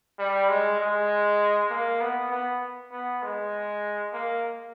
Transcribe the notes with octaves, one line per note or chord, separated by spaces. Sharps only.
G3
G#3
G#3
A#3
B3
B3
B3
G#3
A#3